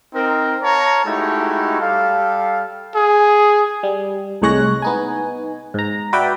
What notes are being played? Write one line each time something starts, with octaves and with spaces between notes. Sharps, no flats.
C4 D#4 A#4
C#5 F5 A5 A#5
G#3 A3 D#4 E4 F#4 G4
G3 G4 A4 F5
G#4
G3
C2 A2 G#3 C#5 F#6 A#6
B3 D#4 G#5
G#2 A#5
F#4 B4 D5 E5 G5